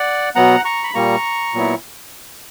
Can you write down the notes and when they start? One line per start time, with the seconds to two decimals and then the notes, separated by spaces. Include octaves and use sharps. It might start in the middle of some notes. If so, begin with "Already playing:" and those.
Already playing: D5 F#5
0.35 B2 F#3 B3 F#5 A#5
0.65 A#5 C#6
0.84 B5
0.94 A#2 G3 A#3 A#5 C#6
1.54 A#2 F#3 B3 E4